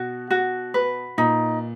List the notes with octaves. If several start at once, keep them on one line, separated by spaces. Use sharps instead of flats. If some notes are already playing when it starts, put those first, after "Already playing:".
Already playing: B2 F#4
F#4
B4
A#2 D#4